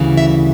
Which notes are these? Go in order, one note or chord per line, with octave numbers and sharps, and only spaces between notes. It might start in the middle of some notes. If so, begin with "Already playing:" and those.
Already playing: D2 C#3 E3 G3
E5